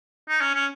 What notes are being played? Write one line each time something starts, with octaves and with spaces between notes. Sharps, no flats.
D#4
C#4
C#4